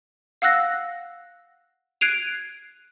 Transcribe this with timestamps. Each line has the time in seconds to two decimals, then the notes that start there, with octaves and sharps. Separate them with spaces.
0.42 F5 F#5 E6 F#6 A#6
2.01 F#6 G#6 C7 D7 D#7 F7